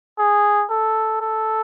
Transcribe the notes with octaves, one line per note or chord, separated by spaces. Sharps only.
G#4
A4
A4